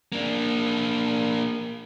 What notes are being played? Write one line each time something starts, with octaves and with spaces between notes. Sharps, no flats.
A#3 D4